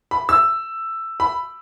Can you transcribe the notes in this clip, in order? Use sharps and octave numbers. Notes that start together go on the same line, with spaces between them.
B5
E6
B5